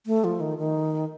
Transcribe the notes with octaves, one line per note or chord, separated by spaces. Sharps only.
A3
F3
D#3
D#3